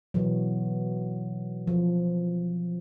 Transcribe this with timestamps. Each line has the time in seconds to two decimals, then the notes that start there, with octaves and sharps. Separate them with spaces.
0.14 B2 E3 F#3
1.67 F3